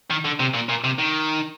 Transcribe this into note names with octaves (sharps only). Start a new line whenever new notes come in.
D#3
D3
C3
A#2
A#2
C3
D#3